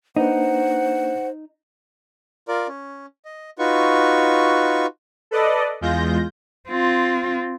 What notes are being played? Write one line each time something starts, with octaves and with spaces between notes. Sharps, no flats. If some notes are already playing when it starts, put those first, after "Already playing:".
A#3 D4 D#4 B4 C5 F#5
F4 A#4 D5
C#4
D#5
D#4 F4 F#4 B4 C#6
A4 B4 D5 D#5
E2 G#3 F4 G6 A#6
C4 F4